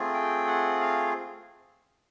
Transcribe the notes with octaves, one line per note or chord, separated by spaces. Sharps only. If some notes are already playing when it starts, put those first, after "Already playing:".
Already playing: A3 C4 F4 G#4
G5
F#5
F5